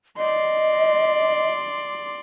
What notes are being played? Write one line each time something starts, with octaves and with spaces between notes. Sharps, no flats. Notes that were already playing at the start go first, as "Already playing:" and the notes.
D5 D#5 C6